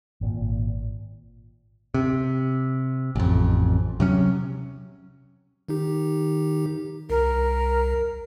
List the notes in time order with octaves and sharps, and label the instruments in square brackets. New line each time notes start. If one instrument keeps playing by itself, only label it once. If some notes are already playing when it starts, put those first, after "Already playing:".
[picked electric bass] G#1 A#2
C3
A1 F2
C3 F#3 C#4
[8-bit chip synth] D#3 D#4 G4
[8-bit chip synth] C2 [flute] A#4